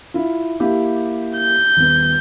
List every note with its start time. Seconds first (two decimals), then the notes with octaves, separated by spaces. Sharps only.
0.14 E4 F4
0.60 A#3 E4 G4
1.38 G6
1.77 D#1 B3